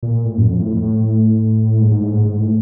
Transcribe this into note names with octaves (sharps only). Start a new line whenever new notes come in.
A#2
A2
F#2
F2
A2
A2
G#2
G#2
A2
G#2
G#2
A2